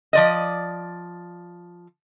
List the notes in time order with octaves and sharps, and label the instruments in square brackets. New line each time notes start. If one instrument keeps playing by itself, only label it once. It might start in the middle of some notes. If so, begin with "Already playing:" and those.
[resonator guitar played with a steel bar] F3 D5 D#5